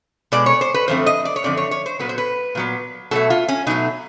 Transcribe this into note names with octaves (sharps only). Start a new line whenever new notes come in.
B2 G#3 D5
C#5
C5
B4
F#2 D3 F3 A3 C4 C5
D#5
D5
C#5
F#2 D3 F3 A3 C4 D5
C#5
C#5
C5
A#2 F#3 B3 B4
C5
B4
A#2 F#3 B3
B2 F#3 A3 A4
F4
C#4
B2 F#3 A3 D#4